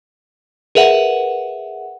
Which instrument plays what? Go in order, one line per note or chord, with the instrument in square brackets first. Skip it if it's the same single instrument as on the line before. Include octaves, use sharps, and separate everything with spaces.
[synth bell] G#4 A#4 B4 E5 F#5